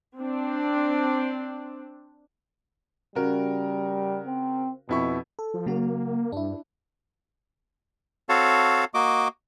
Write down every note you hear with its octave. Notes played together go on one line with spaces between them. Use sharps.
C4 D4
C#3 G3 F#4 A#4
C4
F2 B2 E4 C#6
A4
F3
C#3 F#3 A#3 F#4
G2 D4 E4
C4 F#4 A4 C#5 F5 A5
A#3 F#4 D#5 D6